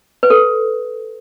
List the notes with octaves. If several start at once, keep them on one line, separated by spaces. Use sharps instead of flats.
B4
A4